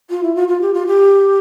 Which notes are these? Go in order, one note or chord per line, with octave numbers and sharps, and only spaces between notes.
F4
E4
F4
F4
G4
F4
G4